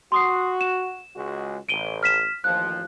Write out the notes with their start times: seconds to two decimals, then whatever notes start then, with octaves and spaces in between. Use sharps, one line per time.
0.12 F#4 C6 D#6 C7
0.61 E7
1.16 C#2 G#3 F#4
1.69 A1 D7 D#7 G7
2.03 F6 B6 E7
2.44 A1 D#2 F3 F#6